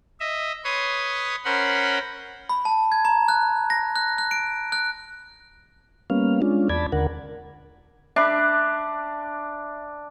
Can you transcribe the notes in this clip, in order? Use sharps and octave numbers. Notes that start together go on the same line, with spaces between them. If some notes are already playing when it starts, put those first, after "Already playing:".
D#5 E5
B4 C#5 C6 D#6
C#4 A#4 C5 F#5 B5 C6
B5
A5
G#6
A#5
F#6
A#6
F#6
F#6
D7
F#6
G3 A#3 B3 C#4 F5
G#3 C#4 D4 F4
E2 D5 A5 B5 G#6
D#2 D3 A#4 F#5
D4 E5 B5